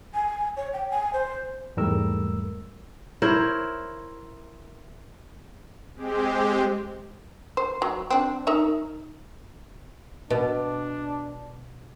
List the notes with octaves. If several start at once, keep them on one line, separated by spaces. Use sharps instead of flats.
G#5
C#5
G5
G#5
C5
E2 G#2 G3 A3 A#4 E6
E4 A#4 C5 C#5
G#3 C4 G4
C5
F#3
C4 D4
D#4 A#4 E5
B2 D4